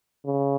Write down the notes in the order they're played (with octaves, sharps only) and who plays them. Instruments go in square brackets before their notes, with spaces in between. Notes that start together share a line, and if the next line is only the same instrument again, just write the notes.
[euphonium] C#3